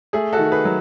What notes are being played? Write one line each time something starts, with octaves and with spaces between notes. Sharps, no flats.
A3 G#4
F#4 A4
D#3
G#4 B4
F#3